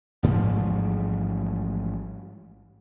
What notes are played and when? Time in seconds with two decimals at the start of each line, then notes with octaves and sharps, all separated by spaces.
0.23 A1 G#2 F3 G3